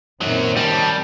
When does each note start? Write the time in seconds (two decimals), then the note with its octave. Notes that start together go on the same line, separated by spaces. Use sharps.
0.21 F#2 A#2 D#3 F#3 C4
0.57 G3 D#5 A5